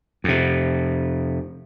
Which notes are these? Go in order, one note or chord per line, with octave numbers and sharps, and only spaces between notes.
F2 C3